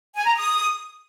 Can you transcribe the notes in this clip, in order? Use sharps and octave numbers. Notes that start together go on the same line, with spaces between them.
G#5
A#5
D#6